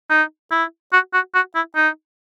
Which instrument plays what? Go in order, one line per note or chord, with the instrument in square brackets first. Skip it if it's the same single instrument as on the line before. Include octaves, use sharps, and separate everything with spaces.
[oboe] D#4
E4
F#4
F#4
F#4
E4
D#4